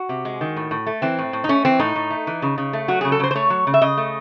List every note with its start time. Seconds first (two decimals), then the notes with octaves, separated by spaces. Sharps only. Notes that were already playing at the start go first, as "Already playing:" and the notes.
Already playing: F#4
0.09 C3
0.25 G#3
0.41 D#3
0.56 A2
0.71 A2
0.87 A3
1.02 E3 C4
1.19 A2
1.33 A2
1.44 D#4
1.49 A3 C#4
1.65 E3 C4
1.79 A2 D#4
1.96 A2
2.10 A3
2.27 E3
2.42 C#3
2.58 C#3
2.73 A3
2.88 F#3 F#4
3.01 C#3 G#4
3.12 A4
3.20 C#3 C5
3.31 C5
3.35 A3 C#5
3.50 F#3
3.67 C#3
3.74 E5
3.82 C#3 D#5
3.97 A3